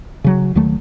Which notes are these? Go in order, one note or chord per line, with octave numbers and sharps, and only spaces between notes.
C#3 F#3
D#2 D#3 F#3 A3